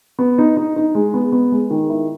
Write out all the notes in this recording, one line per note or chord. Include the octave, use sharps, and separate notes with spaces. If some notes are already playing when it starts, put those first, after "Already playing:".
B3
D#4
D#4
D#4
G#3
B3
B3
G#3
D#3
E4